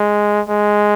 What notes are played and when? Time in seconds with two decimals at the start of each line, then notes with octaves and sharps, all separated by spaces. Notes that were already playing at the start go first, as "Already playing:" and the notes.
Already playing: G#3
0.49 G#3